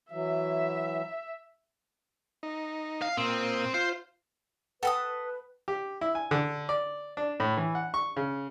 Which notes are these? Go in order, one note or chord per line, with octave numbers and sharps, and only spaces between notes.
E3 F#3 E5
D#4
F5
A#2 C4 D#6
F4 C5
A4 B4 F#5 G5 A5 D#6
G4
E4
G#5
D3
D5
D4
A2
E3
F#5
C#6
C#3